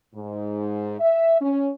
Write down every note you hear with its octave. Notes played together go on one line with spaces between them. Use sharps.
G#2
E5
C#4